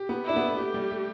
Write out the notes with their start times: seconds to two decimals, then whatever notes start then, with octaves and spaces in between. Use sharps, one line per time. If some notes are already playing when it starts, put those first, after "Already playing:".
Already playing: G4
0.09 B3
0.25 D4 E4
0.36 B3
0.48 A3
0.58 A3 G4
0.74 G3
0.91 A3